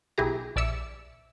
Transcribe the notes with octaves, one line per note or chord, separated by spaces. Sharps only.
B1 E4 G4 G#4 A#5
A#1 D5 E5 E6 C#7